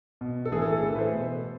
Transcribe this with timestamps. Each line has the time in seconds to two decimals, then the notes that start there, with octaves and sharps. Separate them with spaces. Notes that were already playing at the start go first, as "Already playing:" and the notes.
0.21 B2
0.45 A4
0.52 A2 E3 G#4
0.62 A4
0.72 A4
0.83 A2 E3 A4
0.95 B4
0.98 C5
1.15 B2